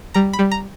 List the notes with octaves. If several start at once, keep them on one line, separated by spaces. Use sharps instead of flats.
G3 A#5
B5
G3
A#5